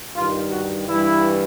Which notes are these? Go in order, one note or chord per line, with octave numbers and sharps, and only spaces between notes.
G2 D#3 F4
F#4
G2 E3 E4